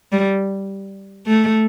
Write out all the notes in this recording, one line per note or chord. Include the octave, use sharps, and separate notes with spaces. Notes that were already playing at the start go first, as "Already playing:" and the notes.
G3
A3